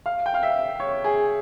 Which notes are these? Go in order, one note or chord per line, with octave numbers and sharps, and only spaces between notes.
F5
G5
F5
E5
C#5
G#4